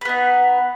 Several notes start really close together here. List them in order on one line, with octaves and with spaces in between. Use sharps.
B4 B3 D#4